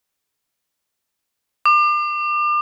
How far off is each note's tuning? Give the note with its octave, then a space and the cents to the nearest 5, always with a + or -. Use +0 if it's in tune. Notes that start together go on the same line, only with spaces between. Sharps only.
D6 +35